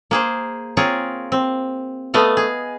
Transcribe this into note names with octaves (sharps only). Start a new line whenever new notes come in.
A#3 G#4 C5
C4 F4 G#4 A#4 C#5
C4
A3 B3 D#5 F5
G#4